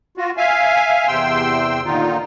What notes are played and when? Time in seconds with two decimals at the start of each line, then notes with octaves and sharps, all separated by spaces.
0.17 F4 F#4
0.37 E5 F5 G#5
1.08 E2 C3 G5 C6 E6
1.85 A#2 D3 D#3 D#4 F4